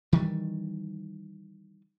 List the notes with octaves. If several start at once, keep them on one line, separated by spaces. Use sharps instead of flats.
D#3 E3 G3